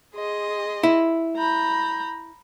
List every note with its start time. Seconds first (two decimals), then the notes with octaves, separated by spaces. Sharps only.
0.15 G#4 D#5 C6
0.83 E4
1.36 A#5 B5 G6